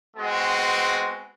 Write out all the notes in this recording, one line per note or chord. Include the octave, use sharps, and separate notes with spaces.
G#3 B3 C4 F#4